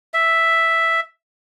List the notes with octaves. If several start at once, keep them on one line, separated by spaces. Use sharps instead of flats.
E5